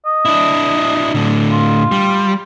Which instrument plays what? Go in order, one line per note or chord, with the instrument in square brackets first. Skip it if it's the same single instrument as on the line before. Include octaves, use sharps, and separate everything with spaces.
[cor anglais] D#5
[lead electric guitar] D4 E4
A2 D3
[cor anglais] F4
[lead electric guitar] G3